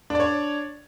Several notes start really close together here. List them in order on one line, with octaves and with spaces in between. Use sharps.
D4 D5 C#5